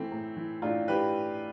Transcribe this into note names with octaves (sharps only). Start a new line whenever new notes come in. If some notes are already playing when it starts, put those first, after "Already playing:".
Already playing: E3 A3 C4
A2
E3
A2 D4 F4
E3 G4 B4